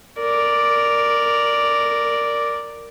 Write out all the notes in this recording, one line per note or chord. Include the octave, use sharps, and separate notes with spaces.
A#4 D5